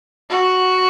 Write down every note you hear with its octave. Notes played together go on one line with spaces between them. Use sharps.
F#4